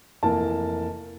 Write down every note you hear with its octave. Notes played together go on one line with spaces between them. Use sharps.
F1 E3 A#3 A5